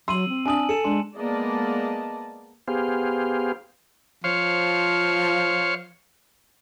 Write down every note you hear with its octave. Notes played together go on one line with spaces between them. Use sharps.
F#3 C6 E6 D#7 F#7
C4
D4 G#5 D#6 F#7
A4 C#7 E7
G#3 D4 C6
G#3 A#3 B3 D5 D#5 A5
B3 G4 G#4 C5 F5
F3 C5 C#5 F5